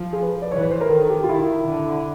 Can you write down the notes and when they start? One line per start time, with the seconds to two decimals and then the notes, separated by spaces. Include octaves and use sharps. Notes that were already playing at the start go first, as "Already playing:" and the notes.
Already playing: F3
0.13 G#4
0.22 B4
0.42 D5
0.52 E3 C#5
0.61 B4
0.71 C5
0.81 A#4
0.90 D#3 A4
1.09 G4
1.24 F4
1.29 D#3 E4
1.68 D3